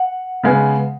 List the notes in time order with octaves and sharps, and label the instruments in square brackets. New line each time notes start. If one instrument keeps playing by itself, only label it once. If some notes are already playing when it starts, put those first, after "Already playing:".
Already playing: [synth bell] F#5
[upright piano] C#3 G#3 B3